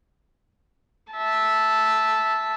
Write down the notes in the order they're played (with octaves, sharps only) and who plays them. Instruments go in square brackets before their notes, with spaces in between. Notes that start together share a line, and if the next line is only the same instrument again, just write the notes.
[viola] E5 A5